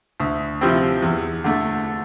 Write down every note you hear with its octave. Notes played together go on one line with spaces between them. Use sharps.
D2
C3 F3 C4 E4
E2
D3 A3